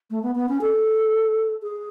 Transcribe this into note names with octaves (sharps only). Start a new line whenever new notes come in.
A3
B3
B3
C#4
A4
G#4